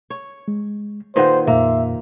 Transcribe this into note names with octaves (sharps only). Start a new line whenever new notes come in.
C#5
G#3
A#2 D#3 G#4 B4 C5 F#5
F2 A#2 A#3 E5